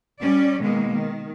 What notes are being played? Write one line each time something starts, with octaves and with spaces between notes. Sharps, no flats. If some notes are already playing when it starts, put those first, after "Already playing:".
G3 C#4 D5
B2 D#3 G#3 A#3
D#3